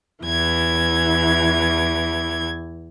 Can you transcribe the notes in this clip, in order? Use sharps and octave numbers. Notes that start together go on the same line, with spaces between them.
E2 E3 G#6